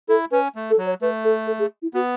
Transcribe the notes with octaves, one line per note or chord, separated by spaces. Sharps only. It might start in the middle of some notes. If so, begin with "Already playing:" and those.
E4 A4
C#4 B4
A3
A4
F#3
C#5
A3 B4
A4
A4
G#4
E4
B3 F#4